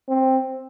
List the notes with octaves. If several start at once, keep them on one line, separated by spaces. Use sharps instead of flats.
C4